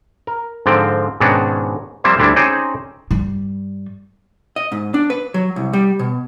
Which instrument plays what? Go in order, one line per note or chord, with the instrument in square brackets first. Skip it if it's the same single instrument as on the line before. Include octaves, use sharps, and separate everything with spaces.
[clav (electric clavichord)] A#4
G#2 D3 F3 C4 G5
G#2 B2 D#3 C#4 D4 F#4
F3 G3 A#3 C4 C5 E5
D2 G3 C4 D4 E4
C4 C#4 D#4 G#4 C5 D5
[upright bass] G2 G3
[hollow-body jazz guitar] D#5
G#2
D4
B4
F#3
C2
G3
B2